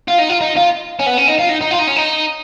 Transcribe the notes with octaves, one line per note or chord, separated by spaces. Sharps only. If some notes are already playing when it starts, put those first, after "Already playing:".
F4
D#4
F4
D#4
F4
C#4
B3
C#4
D#4
F4
D#4
D#4
F4
D#4
C#4
D#4